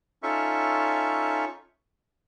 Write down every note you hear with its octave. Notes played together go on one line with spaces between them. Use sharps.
C#4 D#4 F4 A4 E5 C#6